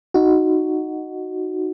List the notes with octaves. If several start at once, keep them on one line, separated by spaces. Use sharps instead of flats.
D#4 F#4